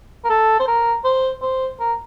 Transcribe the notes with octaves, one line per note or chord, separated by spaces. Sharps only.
A#4
A4
C5
A#4
C5
C5
A#4